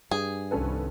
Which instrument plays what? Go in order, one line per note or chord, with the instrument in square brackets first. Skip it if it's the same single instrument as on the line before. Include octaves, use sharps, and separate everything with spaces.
[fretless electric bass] G2 [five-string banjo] G#4
[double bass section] C2 D#3 [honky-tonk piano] C#4 A4 B4